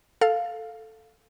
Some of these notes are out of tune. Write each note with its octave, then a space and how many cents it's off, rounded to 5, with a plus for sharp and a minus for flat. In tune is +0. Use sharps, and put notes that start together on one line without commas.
A4 +0 F5 +0